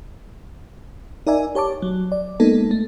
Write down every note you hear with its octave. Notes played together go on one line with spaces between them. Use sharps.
D#4 A#4 D5 E5 G#5
G4 C#5 A5 D6
F#3
D5
G#3 A#3 B3 D#4 A4
A3